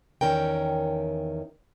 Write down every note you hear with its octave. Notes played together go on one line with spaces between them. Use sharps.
E2 D#3 C#4 A#4 G5